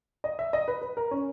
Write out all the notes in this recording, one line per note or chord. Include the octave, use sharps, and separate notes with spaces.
D#5
E5
D#5
B4
B4
A#4
C#4